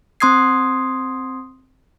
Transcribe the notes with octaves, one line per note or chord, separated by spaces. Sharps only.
C4 C6 D#6 G#6 C7